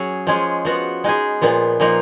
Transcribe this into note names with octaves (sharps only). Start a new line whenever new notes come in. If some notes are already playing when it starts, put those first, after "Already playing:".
Already playing: F#3 C#4 G#4
F3 G#3 C#4 G#4
F3 B3 F#4
G#3 D#4 G#4
A#2 F3 B3
A#2 F3 A#3 D#4